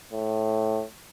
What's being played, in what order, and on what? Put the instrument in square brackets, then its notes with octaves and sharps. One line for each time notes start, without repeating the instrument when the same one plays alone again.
[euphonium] A2